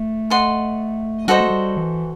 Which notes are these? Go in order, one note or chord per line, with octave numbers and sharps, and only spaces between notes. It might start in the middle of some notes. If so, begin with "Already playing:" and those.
Already playing: A3
A4 D#5 F#5 C6
G3 F#4 A4 C5 D#5
A3
G3
E3